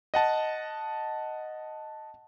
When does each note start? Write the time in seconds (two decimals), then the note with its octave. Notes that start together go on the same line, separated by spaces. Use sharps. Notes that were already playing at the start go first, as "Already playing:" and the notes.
0.14 D#5 F#5 A5